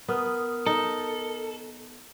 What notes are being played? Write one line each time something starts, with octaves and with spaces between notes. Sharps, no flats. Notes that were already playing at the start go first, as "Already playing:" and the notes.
B3 A#4 D#6 F6
D#4 A4